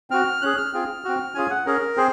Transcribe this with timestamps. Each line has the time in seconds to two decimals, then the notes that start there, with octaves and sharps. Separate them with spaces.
0.10 C4 F#4 F6
0.42 C#4 G#4 F#6
0.57 F6
0.73 C4 F4 G#4
1.05 C4 F#4
1.35 C#4 F4 G#4 G#5
1.50 F#5
1.66 C#4 G#4 A#4
1.97 C4 G#4 C5